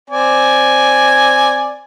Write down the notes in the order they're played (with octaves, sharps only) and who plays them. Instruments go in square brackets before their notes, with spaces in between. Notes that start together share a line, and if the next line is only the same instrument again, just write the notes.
[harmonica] C4 D5 G#5